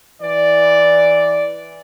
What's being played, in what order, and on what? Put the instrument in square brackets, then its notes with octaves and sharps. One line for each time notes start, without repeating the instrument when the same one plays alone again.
[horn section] E3 D5